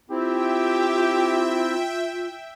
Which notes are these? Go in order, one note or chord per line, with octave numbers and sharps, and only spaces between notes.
C4 E4 F4 G4 E5 G5